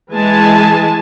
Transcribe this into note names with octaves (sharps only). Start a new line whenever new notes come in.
E3 G#3 G#5 A5